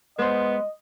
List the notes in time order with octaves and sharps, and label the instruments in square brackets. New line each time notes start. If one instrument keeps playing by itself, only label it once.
[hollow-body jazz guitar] G#3 C5 [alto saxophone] B3 [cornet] D#5